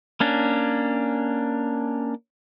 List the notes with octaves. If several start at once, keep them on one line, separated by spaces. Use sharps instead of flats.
A#3 C#4 D4